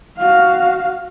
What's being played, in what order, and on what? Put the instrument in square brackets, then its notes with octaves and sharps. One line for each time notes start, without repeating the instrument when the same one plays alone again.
[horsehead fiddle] F#4 F5